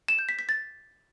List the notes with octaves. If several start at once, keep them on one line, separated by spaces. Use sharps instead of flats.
E7
G6
B6
B6
A6